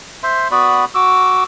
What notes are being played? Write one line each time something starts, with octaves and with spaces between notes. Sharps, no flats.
C5 E5 C6
B3 F#4 D5 B5
F#4 D6 E6